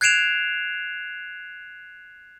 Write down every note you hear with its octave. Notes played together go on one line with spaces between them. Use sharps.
F#6 G#6 C7 D7 E7 F7